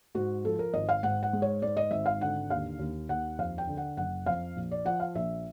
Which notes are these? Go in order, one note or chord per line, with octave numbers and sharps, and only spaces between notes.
G#2 F#4
F3 A4
A#4
G#1 D#5
F5
G#2 F#5
F#5
G#3
C#5
G#2 D5
D#5
G#1 E5
F5
D3 F#5
D#2 F5
D#2
D#2 F#5
F2 F5
G5
D3
F#5
F#1 F#5
F2 F5
A#1
D5
F3 F#5
F5
A#1 E5